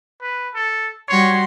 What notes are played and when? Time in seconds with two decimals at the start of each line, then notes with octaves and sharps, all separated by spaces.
0.22 B4
0.55 A4
1.08 G3 F#4 C#5 C6